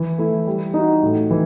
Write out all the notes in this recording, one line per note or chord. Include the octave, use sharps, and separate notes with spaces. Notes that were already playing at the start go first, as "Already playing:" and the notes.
Already playing: E3
A3 E4
G3
D#4 F#4
A2
E3